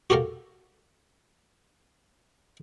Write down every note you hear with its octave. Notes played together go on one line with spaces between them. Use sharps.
F#4 G4 A4 A#4 F5